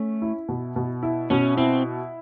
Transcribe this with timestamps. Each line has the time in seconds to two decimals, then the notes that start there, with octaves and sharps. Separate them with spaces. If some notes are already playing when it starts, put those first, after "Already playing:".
Already playing: A3 C#4
0.22 E4
0.49 B2
0.76 B2
1.03 E4
1.30 B2 C#4
1.57 C4 E4